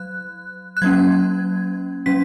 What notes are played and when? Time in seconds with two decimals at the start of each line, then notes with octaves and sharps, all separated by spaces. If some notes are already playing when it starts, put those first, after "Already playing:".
Already playing: F#3 F#6
0.77 F#6
0.82 F#3 A#3 C#4 G#6
2.06 F#3 C#4 B6